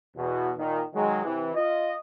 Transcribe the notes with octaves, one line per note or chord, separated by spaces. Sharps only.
E2 B2
A#2 D#3
D#3 F#3 G#3
C3 E3
F4 D#5